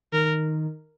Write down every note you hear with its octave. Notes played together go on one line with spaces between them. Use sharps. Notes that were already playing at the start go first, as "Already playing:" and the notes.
D#3 A#4